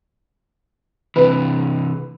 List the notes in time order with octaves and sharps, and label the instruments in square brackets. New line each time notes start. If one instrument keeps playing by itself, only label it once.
[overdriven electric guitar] C3 E3 [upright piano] B4